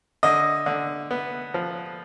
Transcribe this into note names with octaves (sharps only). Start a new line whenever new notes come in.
D3 D#5
D3
B3
F3